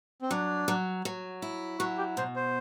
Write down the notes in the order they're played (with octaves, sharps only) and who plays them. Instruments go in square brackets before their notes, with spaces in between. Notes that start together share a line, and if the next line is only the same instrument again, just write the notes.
[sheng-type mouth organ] C4
[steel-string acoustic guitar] F#3 [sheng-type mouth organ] D4
[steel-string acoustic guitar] F#3
F#3
E4
[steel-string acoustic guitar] F#3 [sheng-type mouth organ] F#4
[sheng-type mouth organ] G4
[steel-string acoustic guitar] B2 [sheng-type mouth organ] C5
[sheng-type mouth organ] C5